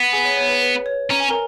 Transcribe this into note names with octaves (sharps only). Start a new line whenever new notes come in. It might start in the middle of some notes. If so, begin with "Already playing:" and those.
Already playing: B3
G#4 G#5
C#5
C#5
B4
B4
C#5
C#4 A#5
G#5
A#4 A#5